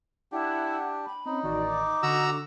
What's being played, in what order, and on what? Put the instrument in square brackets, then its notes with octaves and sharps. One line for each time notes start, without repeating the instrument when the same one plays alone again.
[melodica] D4 G4 [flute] E4 [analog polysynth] F#5
[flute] B5
[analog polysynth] C4 C#4 [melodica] D#4
[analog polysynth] A1 D#3 D5 [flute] F#4
[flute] D6
[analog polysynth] D3 [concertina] F#4 A#5 E6